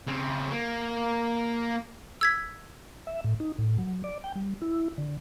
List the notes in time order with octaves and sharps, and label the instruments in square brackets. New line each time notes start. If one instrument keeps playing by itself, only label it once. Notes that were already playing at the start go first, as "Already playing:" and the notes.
[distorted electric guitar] C#3 C4
A#3
[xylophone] E6 G#6 B6
[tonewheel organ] E5
A2
D#4
A2
F#3
D5
G5
G3
E4
D3